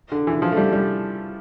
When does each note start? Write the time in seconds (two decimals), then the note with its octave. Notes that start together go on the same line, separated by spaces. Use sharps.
0.12 D3
0.27 E3
0.42 F3
0.52 A3
0.57 G3
0.73 G3